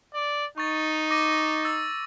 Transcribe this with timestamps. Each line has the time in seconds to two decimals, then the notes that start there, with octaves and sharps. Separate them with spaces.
0.14 D5
0.58 D#4 C#6 A6
1.11 D6 A#6 D#7
1.65 E6 A6